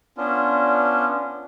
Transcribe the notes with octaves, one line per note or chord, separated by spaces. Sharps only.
B3 C#4 D4 F4